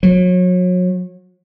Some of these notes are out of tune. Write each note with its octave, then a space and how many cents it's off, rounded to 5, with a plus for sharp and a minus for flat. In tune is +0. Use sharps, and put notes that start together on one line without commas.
F#3 -35